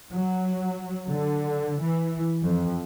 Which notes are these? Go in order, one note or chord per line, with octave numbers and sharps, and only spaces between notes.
F#3
D3
E3
F2